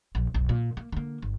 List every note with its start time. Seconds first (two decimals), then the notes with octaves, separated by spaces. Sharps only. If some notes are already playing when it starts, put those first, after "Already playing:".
0.15 A#1
0.34 F1 B1
0.49 A#2
0.77 A#3
0.92 D3 A#3
1.22 G1